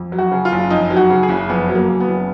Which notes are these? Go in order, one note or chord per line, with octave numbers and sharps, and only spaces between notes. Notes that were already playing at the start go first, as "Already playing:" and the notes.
Already playing: F2
F#3
F#4
C#3
F4
F#1
F2 D#4
F#3
F#4
C#3
G#4
F#1
F2 B3
F#3
A#3
C#3
B3
F#1